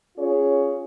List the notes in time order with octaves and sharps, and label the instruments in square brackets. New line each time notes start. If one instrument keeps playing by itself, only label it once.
[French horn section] C#4 F4 G#4 C#5